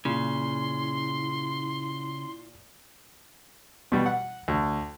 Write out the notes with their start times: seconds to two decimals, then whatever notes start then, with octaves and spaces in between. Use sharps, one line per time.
0.05 A#2 C#3 E4 C6
3.92 B2 G3
4.06 F#5
4.48 D2